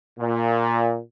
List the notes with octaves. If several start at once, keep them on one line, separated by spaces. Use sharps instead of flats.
A#2